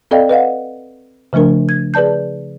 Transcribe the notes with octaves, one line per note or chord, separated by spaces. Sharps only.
C4 A4 D5 D#5 F5 G5
B4 D#5 F5 F#5
C#3 F3 A3 D4 A#4
G#6
G#4 B4 D5 A5 G6